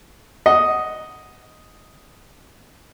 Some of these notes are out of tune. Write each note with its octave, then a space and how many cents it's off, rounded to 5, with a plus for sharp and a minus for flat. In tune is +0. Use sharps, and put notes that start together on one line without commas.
D#5 +0 F#5 +0